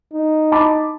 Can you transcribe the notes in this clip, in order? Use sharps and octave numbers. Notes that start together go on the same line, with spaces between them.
D#4
A5 B5 D6